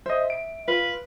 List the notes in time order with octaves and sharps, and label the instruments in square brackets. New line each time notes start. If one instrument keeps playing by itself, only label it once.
[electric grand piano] C5 D#5 [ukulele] E5
[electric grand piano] D7
[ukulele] F4 [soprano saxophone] B4